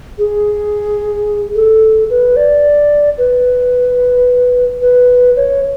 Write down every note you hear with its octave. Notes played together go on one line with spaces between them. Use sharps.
G#4
A4
B4
D5
B4
B4
C#5